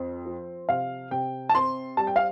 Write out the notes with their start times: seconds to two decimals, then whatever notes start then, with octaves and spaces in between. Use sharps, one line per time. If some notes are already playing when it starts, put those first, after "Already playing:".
Already playing: F2 C4
0.25 F3
0.69 C3 F5
1.11 C3 G5
1.49 A5
1.55 C4 C6
1.97 G3 A5
2.07 G5
2.16 F5